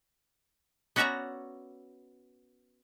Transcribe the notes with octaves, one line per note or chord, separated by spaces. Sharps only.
B3 C#4 F#4 D5 E5 A#5